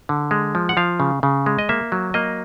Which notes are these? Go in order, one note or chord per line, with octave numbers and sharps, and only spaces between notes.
D3
G#3
F3
F#5
F3 F5
C#3
C#3
G#3
D#5
A#3 E5
F#3
A#3 D#5